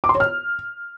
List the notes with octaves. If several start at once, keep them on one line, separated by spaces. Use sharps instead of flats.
D6
C6
C#5
F6